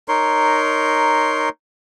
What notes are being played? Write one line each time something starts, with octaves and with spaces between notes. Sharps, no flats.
D#4 A#4 C#5 C6